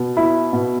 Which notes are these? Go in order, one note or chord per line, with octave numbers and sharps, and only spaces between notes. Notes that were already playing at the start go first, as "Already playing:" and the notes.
Already playing: B2
E4
B2